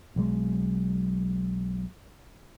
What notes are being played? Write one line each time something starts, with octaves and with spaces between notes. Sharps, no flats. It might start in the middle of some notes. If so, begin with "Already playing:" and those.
B1 F#3 G#3